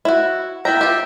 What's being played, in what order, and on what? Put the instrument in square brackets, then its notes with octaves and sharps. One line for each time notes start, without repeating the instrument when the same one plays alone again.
[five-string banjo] E4 F#4
[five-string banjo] B3 E4 A#5 [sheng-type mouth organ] E5 G5
[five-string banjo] F4 G4